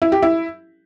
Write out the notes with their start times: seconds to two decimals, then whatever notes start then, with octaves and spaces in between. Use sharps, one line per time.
0.02 E4
0.12 G4
0.22 E4